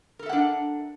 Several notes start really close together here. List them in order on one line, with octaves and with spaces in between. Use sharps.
A#4 A4 E5 F#5 D4